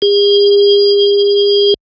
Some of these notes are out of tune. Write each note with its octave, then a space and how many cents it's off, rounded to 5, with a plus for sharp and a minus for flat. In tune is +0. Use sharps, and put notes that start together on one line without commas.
G#4 -45